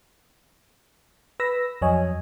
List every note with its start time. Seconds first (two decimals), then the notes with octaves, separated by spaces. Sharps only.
1.40 B4 B5 E6 A#6
1.81 F2 F#3 C#5 D#5 G#5